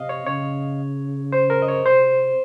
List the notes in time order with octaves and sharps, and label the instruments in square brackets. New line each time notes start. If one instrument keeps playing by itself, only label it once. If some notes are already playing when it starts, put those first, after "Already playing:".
Already playing: [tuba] C3 [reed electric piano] D#5 F5
[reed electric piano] C#5
[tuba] C#3 [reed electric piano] C#5
[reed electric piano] C5
A#4
D#5
C#5
[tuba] C3 [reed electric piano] C5